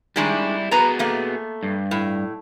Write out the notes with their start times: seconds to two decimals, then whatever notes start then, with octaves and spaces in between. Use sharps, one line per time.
0.16 D#3 G3 G#3 D4 E4
0.71 B3 F#4 G#4 B4 A#5
0.99 A3 A#3
1.63 G2
1.91 A2